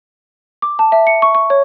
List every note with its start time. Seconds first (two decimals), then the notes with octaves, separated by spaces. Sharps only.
0.62 D6
0.79 A5
0.92 E5
1.07 C#7
1.22 C#6
1.35 C#6
1.50 C#5